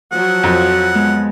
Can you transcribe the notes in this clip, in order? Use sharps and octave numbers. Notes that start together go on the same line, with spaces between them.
F3 F#3 F#4 F#5
F2
G#3 B3